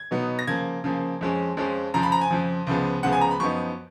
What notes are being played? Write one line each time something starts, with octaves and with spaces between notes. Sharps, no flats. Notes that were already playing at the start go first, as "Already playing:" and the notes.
Already playing: G#6
B2 F#3 B3 D#4
A#6
C#3 F3 A#3 G#6
C#3 F3 A#3
F2 F3 G#3 C#4
F2 F3 G#3 C#4
F2 C#3 F3 A#5
B5
A#5
G#5
F2 C#3 F3
C#2 C#3 F3 G#3 B3
C#2 C#3 F3 G#3 B3 F#5
G#5
A#5
B5
F#2 F3 B3 D#4 C#6